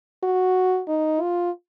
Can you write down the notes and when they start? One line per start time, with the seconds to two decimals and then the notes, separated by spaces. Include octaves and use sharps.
0.23 F#4
0.88 D#4
1.21 F4